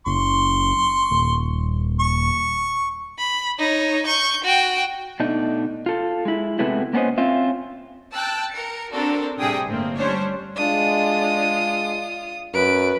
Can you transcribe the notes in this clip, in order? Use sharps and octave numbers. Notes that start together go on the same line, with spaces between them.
F#1 C6 C#6
D#1
C#6
B5
D#4 C#5
C#6 G6
F#4 G5
B2 A3 D4 D#4
F4 A4
G#3 E4
C3 G#3 A3 B3 E4 F#4
A#3 B3 C#4 C5 D#5
C4 C#4 F4 E5
G5 A5 E6 F#6
A#4 C#7
C4 D4 F#4 A4 A#4
A2 C3 G3 G#4 G5 D#6
G1 A2 A#3 C4
G3 C#4 D4 C5 C#5
G#3 D4 F4 D#6
F#2 B4 D7